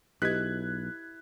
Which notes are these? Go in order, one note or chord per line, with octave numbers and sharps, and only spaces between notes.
B1 E4 G4 B4 D#5 F#6 G#6 B6